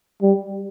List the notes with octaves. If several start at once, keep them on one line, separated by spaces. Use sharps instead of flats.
G3